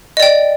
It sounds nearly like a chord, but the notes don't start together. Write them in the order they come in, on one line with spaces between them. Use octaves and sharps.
D#5 D5 G5